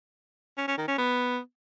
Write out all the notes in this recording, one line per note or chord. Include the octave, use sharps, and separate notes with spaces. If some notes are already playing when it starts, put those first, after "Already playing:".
C#4
C#4
D#3
C#4
B3